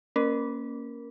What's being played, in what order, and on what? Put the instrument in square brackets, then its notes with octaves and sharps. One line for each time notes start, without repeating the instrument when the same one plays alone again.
[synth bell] A#3 C#4 A#4